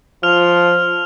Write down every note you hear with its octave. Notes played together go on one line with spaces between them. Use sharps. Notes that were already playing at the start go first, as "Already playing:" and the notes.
F3 F6 F7